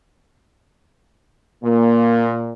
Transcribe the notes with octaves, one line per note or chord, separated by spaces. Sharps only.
A#2 A#3